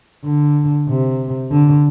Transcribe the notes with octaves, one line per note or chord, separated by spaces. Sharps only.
D3
C3
D3